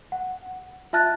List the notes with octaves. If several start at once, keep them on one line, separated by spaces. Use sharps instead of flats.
F#5
F4 E5 A5 F6 F#6 A6